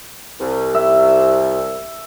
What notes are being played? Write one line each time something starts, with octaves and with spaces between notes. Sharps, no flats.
C2
E5